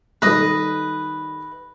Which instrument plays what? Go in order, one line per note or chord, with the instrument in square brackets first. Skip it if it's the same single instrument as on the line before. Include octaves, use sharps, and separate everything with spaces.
[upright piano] D#3 G3 D#4 A4 [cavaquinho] B4 D#5